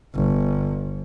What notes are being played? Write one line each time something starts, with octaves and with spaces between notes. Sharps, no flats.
G1